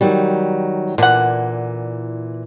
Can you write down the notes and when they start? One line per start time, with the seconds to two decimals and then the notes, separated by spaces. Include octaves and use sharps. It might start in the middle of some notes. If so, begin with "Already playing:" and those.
0.01 D#3 F#3 G3
0.98 A#2 D3 E3 F#5